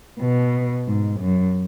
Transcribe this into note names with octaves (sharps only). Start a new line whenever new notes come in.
B2
G#2
F#2